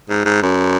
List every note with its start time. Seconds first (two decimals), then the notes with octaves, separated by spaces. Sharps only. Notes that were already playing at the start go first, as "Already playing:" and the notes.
0.10 G#2
0.25 G#2
0.42 F#2